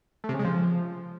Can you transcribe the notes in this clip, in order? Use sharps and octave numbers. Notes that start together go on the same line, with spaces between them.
A3
C3
C#3
G#3
F3